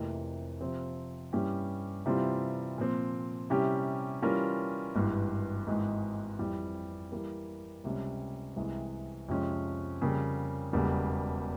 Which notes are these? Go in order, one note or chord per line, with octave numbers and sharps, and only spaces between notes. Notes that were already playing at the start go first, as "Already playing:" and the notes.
Already playing: F1 F2 C3 E3 A#3
C3 F3 C4
G2 G3 C#4 E4 G4
C3 E3 G3 C4 F4
A#2 F3 C4
C3 G3 C#4 E4 G4
E3 G3 C#4 F4 A#4
G#1 G2 E3
G#1 G#2 E3 G#3
F2 E3 G3
E3 G3 A#3
C#2 C3 G3 C#4
C2 C3 E3 G#3
F2 C3 F3 G#3 C#4
F2 C#3 G3 A#3
E1 E2 C#3 G3 A#3